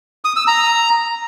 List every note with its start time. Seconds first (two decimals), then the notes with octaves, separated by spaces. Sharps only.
0.25 D#6
0.36 E6
0.47 A#5